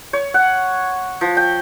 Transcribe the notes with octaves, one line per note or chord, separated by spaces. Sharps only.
C#5
F#5
F3
G5